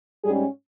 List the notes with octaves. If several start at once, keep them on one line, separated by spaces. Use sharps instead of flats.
G#2 G3 C#4 G#4